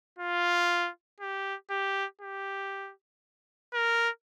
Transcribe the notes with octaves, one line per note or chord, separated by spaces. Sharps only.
F4
G4
G4
G4
A#4